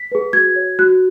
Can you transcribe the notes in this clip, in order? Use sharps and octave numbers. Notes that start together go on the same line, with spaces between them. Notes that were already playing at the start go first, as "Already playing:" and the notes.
Already playing: B6
G#4 B4
F#4 G#6
C#5
F#4 F#6